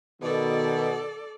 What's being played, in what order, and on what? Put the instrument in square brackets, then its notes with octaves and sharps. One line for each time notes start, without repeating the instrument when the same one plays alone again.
[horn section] B2 [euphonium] D#3 [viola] A4 D5